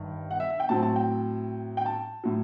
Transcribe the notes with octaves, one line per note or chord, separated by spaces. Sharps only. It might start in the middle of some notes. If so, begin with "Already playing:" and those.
Already playing: G1 G2 D#3
F#5
E5
E5
G5
A2 F#3 C4 A5
A5
G5
G5
A5
A2 F#3